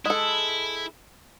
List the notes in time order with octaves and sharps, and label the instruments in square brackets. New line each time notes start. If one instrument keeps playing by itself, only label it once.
[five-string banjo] G#3 A4 [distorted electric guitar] E4